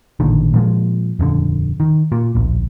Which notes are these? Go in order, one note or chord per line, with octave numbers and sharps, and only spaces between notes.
A1 A#2 D3 D#3
A#2 F3 G#3
D#1 F2 D3
D#3
A#2
D1 A#1